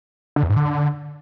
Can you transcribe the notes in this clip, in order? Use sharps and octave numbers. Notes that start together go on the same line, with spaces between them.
D3
E2
G#2
D3